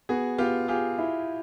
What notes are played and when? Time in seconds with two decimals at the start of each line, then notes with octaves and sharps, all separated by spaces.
0.09 B3 F#4 G#4
0.38 B3 F4 G4
0.68 F4 G4 G#4
0.98 E4